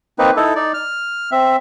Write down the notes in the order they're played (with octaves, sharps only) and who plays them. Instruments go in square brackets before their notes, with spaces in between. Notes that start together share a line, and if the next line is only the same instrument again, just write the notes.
[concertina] A#3 C4 D#4 B4
D#4 E4 A4
D#4 D5
F6
C4 E5